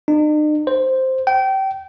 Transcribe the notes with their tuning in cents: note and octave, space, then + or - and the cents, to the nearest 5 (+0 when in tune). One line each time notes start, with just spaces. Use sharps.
D#4 -45
C5 +0
G5 -25